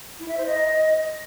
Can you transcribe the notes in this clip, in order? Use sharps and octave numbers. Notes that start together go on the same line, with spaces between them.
E4
E5
C5
D#5